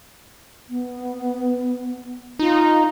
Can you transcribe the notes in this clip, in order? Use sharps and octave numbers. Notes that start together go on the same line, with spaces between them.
B3
D#4 F4